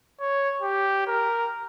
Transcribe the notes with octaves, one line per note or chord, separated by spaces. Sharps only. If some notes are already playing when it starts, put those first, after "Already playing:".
C#5
G4
A#4